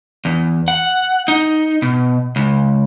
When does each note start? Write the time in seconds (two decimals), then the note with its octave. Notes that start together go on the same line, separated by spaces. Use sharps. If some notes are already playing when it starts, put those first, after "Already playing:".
0.25 E2
0.68 F#5
1.28 D#4
1.82 B2
2.36 C#2